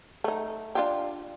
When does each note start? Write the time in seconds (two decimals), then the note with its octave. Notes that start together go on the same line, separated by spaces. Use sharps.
0.24 A3 D#4
0.75 D4 F4 G4